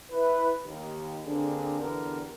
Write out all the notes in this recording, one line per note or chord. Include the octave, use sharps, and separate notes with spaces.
E4 B4
D#2
D3 A#3 C4 D4 G4 G#4
E2 D3 B3 G4 A#4